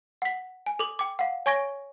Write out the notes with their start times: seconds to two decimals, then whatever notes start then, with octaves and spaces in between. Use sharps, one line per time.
0.22 F#5 B6
0.66 G#5
0.79 A4 D6 F#7
0.99 G5 D6
1.19 F5 F#5
1.46 C#5 G#5 C#6 G#6 A#6 D7